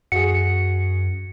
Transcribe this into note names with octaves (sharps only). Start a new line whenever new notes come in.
F#2 F#4 G#4 C#7